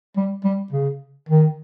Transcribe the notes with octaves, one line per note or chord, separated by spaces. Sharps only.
G3
G3
C#3
D#3